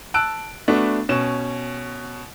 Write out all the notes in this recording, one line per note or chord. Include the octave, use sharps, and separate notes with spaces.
A5 E6 F#6 D7
A3 B3 D4 F#4
B2 C#4 E7